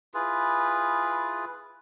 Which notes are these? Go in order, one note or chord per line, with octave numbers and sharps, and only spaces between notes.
E4 F4 G#4 B4